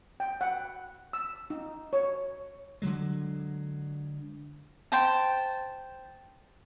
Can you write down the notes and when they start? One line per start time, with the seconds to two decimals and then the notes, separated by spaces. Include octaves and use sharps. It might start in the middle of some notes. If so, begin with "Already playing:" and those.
0.20 G5
0.41 F#5
1.13 E6
1.50 D#4
1.93 C#5
2.82 D3 E3 F#3 G#3
4.92 C5 G5 A5